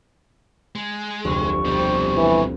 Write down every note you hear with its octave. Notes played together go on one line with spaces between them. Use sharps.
G#3
F1 D2 C#6
B2 G3 C4 G6
E3